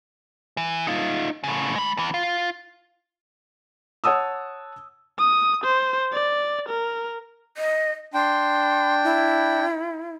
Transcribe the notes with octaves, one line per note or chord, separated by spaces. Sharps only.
E3
D#4 F4
A2 C#3
G#3 B5
E2 E3
F4
C#5 F#5 A5 D#6 E6
D#6
C5
D5
A#4
D#5
D4 G5 C6
E4